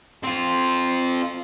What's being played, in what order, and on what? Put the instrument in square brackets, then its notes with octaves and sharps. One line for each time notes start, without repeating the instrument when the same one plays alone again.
[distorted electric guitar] C4 F4